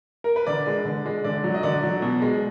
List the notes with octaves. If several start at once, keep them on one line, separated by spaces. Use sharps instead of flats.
A#4
B4
D3 D5
G#3
D3
G#3
D3 D5
F#3
D#5
D3 D5
F#3
B2
G#3